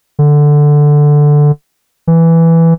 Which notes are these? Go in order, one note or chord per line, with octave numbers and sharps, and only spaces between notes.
D3
E3